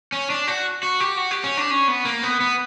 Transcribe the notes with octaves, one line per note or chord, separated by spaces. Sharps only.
C#4
D4
F#4
F#4
G4
F#4
G4
C#4
D4
C#4
B3
A#3
B3
B3